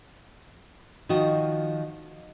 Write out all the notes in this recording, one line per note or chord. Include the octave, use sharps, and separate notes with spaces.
D#3 F3 F#4 D#5